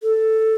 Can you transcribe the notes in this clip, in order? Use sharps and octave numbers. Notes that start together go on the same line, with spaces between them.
A4